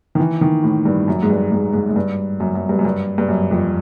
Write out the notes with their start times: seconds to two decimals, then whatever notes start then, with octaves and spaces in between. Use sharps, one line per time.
0.15 D#3
0.19 E3
0.41 D#3
0.63 A2
0.85 G2
1.08 F#2
1.23 G#2
1.30 G2
1.52 G#2
1.73 G#2
1.89 G#2
1.96 G2
2.40 F#2
2.55 F#2
2.69 G2
2.79 F#2
2.85 G2
3.18 G2
3.28 F#2
3.51 F2